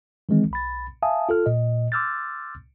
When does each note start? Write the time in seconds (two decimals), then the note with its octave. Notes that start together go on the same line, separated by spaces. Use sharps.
0.29 D#3 E3 G#3 C4
0.51 B1 B5 A6
1.02 E5 F5 G#5 A5 D#6
1.29 F4 A4 F6
1.46 A#2 D#5
1.92 C6 D6 E6 F6 G6 A6